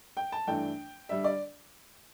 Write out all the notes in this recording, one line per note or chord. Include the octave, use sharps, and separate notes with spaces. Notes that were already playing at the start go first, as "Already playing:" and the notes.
G5
A5
G2 E3 A3 D4 G5
D3 G3 D4 E5
D5